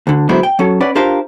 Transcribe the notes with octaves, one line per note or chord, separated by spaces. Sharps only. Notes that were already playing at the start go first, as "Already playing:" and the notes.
D2 D3
D3 F#3 G#3 B3 E4 C5
G5
F#3 C#4 A4
C#4 B4 D5 F#5
D4 F4 G4 A#4 C5 F5